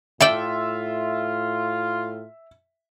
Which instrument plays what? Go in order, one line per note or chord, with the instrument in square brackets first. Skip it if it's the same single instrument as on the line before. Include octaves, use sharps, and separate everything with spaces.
[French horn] A2 [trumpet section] F4 [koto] A4 D5 G5 [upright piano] E5